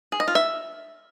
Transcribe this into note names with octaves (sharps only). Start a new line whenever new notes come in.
G#4
D#5
F4
E5